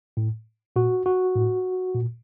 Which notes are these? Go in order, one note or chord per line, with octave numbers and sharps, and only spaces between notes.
A2
A#2 F#4
F#4
A2
A#2